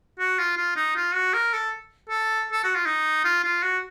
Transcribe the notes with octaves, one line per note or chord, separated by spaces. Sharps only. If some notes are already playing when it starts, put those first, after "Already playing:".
F#4
F4
F4
D#4
F4
F#4
A#4
A4
A4
A4
F#4
F4
D#4
F4
F4
F#4